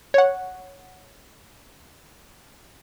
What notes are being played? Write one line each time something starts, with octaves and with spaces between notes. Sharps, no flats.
C#5 F#5